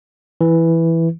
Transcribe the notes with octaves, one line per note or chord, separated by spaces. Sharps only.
E3